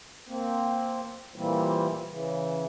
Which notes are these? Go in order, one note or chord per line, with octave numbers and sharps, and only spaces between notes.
A#3 C4
A#2 E3 G3 A#3 C4
C#3 E3